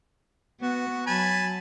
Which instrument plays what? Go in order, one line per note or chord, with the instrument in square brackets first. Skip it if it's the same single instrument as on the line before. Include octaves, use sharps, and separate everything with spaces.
[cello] B3 [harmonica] F#4
[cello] F#3 [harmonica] G#5 A5 B5